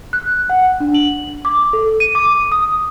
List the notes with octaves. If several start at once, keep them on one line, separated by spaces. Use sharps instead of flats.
F#6
F#5
D4
F#7
D6
A4
D#7
D6
D#6